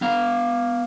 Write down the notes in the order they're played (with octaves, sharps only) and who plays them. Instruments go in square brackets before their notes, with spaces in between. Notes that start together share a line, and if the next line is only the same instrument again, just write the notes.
[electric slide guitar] B3 F5